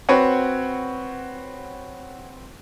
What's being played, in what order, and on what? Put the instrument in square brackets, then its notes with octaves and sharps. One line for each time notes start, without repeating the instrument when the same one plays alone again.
[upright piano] C4 F#4 B4 C#5 F#5